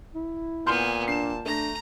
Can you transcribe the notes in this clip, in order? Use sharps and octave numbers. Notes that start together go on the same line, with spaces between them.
E4
A#2 B3 G#5 C6 F6 G6
D4 A5 C7 E7
A3 D4 A#5 A#6